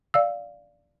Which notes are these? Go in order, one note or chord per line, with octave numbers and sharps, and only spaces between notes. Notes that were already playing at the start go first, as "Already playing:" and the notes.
D5 F5 E6